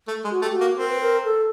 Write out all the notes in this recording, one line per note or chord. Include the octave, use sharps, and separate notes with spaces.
A3
G#3
F#4
A3 G4
F#4
A#3
C4 A#4
B4
A#4
A4